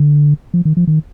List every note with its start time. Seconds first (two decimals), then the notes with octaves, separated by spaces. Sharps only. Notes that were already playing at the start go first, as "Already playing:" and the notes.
Already playing: D3
0.54 F3
0.65 D#3
0.77 F3
0.87 D#3